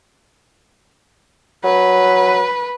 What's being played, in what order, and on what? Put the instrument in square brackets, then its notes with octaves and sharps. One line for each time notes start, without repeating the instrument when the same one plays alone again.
[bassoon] F#3 [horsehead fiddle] B4